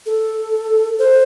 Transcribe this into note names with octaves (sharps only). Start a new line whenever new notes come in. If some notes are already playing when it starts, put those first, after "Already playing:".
A4
C5